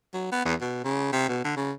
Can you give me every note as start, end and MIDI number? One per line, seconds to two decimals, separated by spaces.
0.14 0.32 54
0.32 0.43 59
0.45 0.55 40
0.61 0.81 47
0.84 1.10 49
1.13 1.27 48
1.29 1.42 47
1.45 1.55 50
1.56 1.72 49